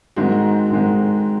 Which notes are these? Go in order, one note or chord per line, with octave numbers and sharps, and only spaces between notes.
G#2 D#3 G#3 C4 F#4
G#2 D#3 G#3 C4